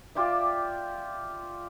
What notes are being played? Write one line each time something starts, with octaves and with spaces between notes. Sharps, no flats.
F4 G4 D5 E5